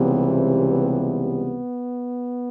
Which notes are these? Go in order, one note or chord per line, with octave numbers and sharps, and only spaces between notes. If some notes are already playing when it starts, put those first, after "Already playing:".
Already playing: C#2 C3 E3 G3 B3
C4
B3